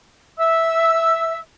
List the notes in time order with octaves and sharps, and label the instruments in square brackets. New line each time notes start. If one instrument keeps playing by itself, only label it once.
[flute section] E5 E6